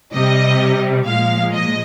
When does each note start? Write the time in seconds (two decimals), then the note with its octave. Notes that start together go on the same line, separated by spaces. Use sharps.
0.14 C3 G3 D#5
1.07 A#2 F3 G#3 F5
1.54 D#5